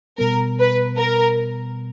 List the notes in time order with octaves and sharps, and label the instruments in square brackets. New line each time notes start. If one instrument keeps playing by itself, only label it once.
[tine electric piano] B2 G3 B3 [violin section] A#4
[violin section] B4
A#4